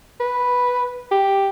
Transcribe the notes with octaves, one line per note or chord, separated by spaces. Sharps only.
B4
G4